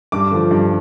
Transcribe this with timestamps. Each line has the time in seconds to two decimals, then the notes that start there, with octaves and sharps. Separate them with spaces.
0.12 G2 D6
0.31 D3 F3
0.51 G2